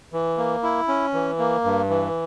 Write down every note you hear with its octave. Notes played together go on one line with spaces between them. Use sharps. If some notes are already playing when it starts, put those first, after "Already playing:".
E3
A#3
E4
C#4
E3
A#3
G2
E3